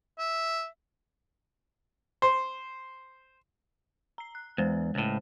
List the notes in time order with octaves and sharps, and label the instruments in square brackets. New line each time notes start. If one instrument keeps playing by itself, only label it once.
[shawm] E5
[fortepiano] C5
[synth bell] A#5 C7
F#6
[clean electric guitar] E2 [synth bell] G#3 C5
[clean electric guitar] C#2 A2